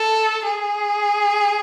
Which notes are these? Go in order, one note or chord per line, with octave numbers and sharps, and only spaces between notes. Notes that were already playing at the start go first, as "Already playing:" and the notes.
Already playing: A4
G#4